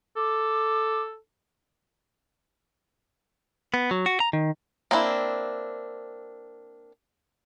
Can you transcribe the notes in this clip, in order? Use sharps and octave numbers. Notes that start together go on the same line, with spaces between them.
A4 D6
B3
F#3
F#4
A#5
D#3
A#3 C4 D4 E4